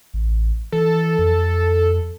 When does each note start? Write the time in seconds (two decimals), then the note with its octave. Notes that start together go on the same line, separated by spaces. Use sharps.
0.14 A1
0.72 E3 A4
1.19 F2